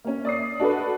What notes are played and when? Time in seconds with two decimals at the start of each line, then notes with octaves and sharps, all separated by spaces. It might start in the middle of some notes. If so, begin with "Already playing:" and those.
0.04 A#3 C#4
0.25 D5 D#6 C7
0.60 D4 F#4 A4 B4